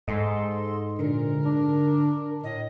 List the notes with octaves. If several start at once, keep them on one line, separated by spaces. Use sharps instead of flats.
G#2 A4 D#5 C6
A#2 D3 A#4
D4
A2 D#5